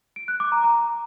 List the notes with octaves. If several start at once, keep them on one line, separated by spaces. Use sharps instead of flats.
D7
F#6
D6
A#5
A#5